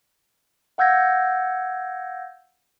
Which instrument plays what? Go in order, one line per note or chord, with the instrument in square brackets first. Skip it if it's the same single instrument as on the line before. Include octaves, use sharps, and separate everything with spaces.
[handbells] F5 F#5 E6 G6 G#6 A#6